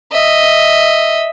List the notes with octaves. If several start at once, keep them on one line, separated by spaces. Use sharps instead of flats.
D#5 E5